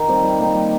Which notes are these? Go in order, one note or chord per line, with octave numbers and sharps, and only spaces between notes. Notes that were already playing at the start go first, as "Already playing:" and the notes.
Already playing: D#3
G3 C4
G3
A#3 D#4
G3